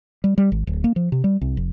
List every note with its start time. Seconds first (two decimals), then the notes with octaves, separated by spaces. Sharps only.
0.24 G3
0.38 G3
0.52 G#1
0.67 D1
0.84 A#3
0.96 F3
1.12 C3
1.24 G3
1.41 C2
1.57 F1